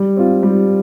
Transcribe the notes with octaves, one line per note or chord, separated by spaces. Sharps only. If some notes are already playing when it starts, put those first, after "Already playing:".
Already playing: G3
C4 F4
G3